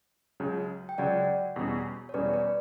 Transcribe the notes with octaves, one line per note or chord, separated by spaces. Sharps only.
C#2 C#3 F#3
G5
C#2 C#3 F#3 D5 F#5
E2 B2 G3 C#4
C#5
E2 B2 G3 C#4 B4 D5
B4 D5